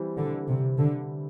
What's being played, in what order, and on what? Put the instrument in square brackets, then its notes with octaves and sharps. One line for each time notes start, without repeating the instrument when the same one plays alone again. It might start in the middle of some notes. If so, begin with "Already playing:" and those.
Already playing: [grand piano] E3 G3 C4 E4
[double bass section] D3
C3
D3